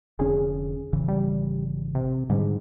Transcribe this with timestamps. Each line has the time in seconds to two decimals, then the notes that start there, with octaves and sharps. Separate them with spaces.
0.19 F1 D3 C#4 G#4
0.93 G#1 C#3 E3
1.08 G3
1.95 C3
2.30 G#2 D3 G3